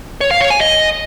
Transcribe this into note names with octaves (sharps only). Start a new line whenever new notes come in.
C#5
F5
C#5
G#5
D#5